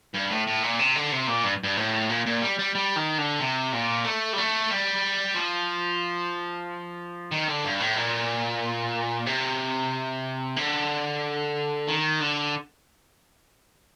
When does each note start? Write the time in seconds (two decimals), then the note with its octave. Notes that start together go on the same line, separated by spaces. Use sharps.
0.14 G2
0.30 A2
0.47 A2
0.63 A#2
0.79 C3
0.96 D3
1.12 C3
1.27 A#2
1.44 G2
1.63 G2
1.77 A2
2.09 A#2
2.26 A#2
2.42 G3
2.59 G3
2.75 G3
2.96 D#3
3.18 D3
3.40 C3
3.72 A#2
4.04 A3
4.33 G3
4.38 A3
4.70 G3
5.35 F3
7.31 D#3
7.48 D3
7.64 G2
7.80 A2
7.96 A#2
9.26 C3
10.57 D3
11.88 D#3
12.20 D3